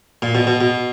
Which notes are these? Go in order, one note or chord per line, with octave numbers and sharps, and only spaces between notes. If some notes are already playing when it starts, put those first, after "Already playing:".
A#2
B2
B2
B2